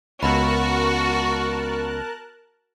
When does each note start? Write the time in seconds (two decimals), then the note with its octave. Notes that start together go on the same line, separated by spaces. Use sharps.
0.23 C#2 B3 F#4 A#4 A5 B5 F#6